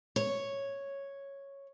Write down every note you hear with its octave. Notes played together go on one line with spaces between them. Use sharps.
C#5